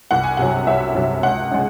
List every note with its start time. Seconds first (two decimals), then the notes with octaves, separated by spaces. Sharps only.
0.11 C2 F#5
0.23 G#5
0.37 C3 F#3 F#5
0.67 C2 E5
0.95 C3 F#3
1.23 C#2 F#5
1.51 C#3 G#3